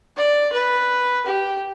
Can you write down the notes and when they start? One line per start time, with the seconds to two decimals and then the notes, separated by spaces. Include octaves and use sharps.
0.17 D5
0.53 B4
1.26 G4